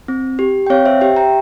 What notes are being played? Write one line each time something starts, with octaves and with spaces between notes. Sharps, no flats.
C4
G4
G5
C4 C#5 F5
C5 E5
G4 E5 G5
G5 A#5